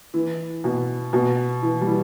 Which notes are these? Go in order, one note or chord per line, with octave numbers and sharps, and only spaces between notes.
E3
B2
B2
E3
G3
E3